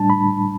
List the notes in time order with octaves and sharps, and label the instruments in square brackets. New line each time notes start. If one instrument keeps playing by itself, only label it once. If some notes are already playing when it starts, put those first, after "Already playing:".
Already playing: [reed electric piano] A2 G3 D4 A5
B5